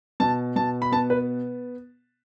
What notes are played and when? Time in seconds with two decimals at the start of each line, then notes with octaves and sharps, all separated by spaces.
0.20 B2 A5
0.56 B2 A5
0.82 B5
0.92 B3 A5
1.10 B4